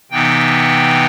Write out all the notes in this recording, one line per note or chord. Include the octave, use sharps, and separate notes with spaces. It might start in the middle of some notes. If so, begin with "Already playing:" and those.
C3 E3 B3 D#4 G5